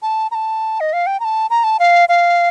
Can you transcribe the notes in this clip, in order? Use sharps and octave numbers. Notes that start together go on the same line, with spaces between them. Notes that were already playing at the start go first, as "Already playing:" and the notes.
A5
A#5
A5
D#5
F5
G5
A#5
A5
A#5
A5
F5
F5